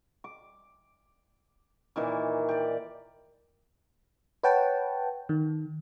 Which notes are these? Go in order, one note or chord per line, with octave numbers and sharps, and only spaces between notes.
D6
A#2 D#3 E3
G4 D5
B4 C#5 F#5 G5 A5
D#3